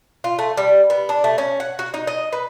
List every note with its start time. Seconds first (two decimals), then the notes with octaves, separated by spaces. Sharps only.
0.24 F4
0.39 A3
0.57 G3
0.90 B3
1.09 D4
1.24 A3
1.38 C#4
1.60 F#5
1.79 F#4
1.94 D#4
2.07 D#5
2.33 B4